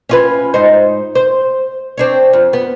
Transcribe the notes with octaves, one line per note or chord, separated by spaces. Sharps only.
C#4 F4 B4
G#2 D#4 C5
C5
C4 D4 C#5
F2
B3